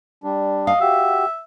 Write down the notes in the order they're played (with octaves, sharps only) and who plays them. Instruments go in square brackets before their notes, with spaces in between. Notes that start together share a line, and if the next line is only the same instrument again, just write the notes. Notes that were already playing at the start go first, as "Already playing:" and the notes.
[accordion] G3 D4
[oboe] D#5 [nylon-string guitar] F5
[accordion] F#4 G4 [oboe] E5